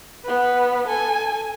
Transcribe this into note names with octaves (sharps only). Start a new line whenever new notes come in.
B3 B4
A4 G#5